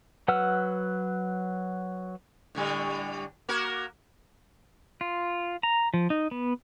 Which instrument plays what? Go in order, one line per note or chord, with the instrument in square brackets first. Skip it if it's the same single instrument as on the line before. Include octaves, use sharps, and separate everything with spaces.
[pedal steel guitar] F#3 B4 F#5 E6 F6
[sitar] A2 D3 G3
A#3 F#4 A#4
[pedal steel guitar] F4
A#5
F3
D#4
B3